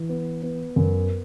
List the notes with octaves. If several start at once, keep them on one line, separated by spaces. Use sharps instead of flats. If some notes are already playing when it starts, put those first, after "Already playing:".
Already playing: E3
B3
B3
F#2